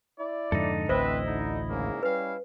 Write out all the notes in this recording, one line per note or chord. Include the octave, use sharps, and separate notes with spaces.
E4 D5
F2 G#2 D3 D#4 A4
A1 D2 C4 E4 B4 C5 D#5 E5
D3 D#4
G#2 C#3 A#3
G3 C#4 B4 F5